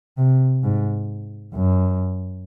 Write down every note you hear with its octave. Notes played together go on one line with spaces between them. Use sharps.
C3
G#2
F#2